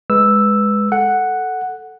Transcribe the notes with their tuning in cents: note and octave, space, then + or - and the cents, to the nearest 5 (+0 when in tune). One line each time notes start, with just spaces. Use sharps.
G#3 +0 B4 +0 E6 +0
A4 +0 F#5 +0